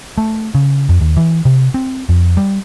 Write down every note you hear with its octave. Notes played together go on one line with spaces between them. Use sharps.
A3
C#3
F2
D#2
E3
C3
C4
F2
G3